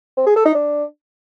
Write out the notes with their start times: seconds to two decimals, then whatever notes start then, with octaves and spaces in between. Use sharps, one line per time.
0.17 C4
0.26 G#4
0.36 A4
0.45 D#4
0.54 D4